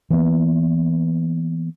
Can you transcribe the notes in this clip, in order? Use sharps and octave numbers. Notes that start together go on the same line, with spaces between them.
E3 A#3 B3